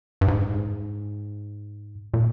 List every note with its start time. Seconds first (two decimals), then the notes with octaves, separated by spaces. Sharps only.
0.21 G2
0.28 G#2
2.14 A#2